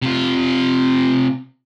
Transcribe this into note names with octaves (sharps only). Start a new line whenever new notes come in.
C3 F4